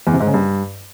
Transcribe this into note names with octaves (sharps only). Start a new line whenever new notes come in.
E2
C3
G#2
C#3
G2